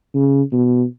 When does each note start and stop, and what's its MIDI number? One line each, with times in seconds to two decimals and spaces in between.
0.15 0.42 49
0.53 0.84 47